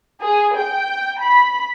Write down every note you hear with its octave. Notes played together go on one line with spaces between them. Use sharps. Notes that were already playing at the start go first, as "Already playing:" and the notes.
G#4
G5
B5